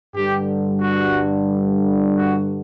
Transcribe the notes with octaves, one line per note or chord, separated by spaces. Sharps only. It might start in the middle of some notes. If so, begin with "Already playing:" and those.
G2 D3 G3 G4
F#4
F#4